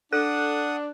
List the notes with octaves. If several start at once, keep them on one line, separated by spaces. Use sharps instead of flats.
D4 A4 F#5 D#6 F#6